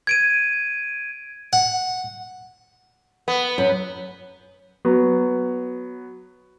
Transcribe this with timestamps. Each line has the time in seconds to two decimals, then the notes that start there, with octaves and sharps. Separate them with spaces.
0.07 G#6 D7 D#7
1.53 F#5
3.28 B3
3.58 F#2
4.85 F#3 B3